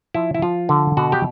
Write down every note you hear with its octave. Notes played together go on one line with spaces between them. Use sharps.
F3 E4
E4
F3 F4
D3
B2 F#4
G4